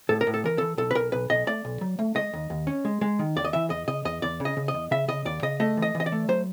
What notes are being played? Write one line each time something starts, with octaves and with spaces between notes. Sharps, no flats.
A2 A4
A#4
A2
A4
E3 A#4
E3 A4
B1 A4
B4
B1 A#4
B1 B4
B1 D#5
A3 D5
B1
F#3
A3
G#3 D#5
D#2
D#2
C#4
G#3
G#3
D#3
D#2 D5
D#5
E3 E5
E2 D#5
C#3 D#5
E2 D#5
E2 D5
C#3
D#5
C#3
D#5
E2
C#3 E5
C#3 D#5
D#2 D5
C#3 D#5
A3 D#5
E3
D#5
E3
D#5
D5
A3
F#3 C5